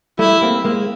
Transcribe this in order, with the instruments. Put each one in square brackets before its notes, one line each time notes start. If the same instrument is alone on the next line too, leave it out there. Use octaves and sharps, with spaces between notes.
[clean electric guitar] G3 A3 [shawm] E4
[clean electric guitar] A#3 C4
G#3 A#3